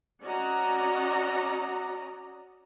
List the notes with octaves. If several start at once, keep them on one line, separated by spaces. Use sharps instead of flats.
C#4 F#4 D5 D#5 A#5